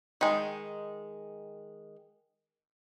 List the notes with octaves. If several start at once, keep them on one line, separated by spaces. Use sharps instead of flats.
D#3 G#3